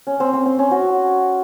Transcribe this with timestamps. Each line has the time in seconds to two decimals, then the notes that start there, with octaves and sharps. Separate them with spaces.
0.07 C#4
0.20 C4
0.33 C4
0.46 C4
0.59 C#4
0.71 F#4